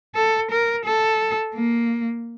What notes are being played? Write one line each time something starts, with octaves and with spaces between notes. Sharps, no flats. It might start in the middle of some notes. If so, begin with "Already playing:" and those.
A4
A#4
A4
A#3